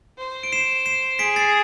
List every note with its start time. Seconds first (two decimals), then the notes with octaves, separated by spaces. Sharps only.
0.18 C5
0.43 D7
0.52 C7 E7
0.86 C7 E7
1.19 G#4 B6 D7
1.36 A6 C7